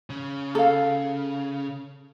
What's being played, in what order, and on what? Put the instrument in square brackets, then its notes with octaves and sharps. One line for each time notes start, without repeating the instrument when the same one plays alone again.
[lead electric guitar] C#3
[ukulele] A4 F5